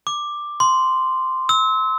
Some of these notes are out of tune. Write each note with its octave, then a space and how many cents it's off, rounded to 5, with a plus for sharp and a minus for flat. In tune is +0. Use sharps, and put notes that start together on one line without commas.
D6 +10
C6 -5
E6 -30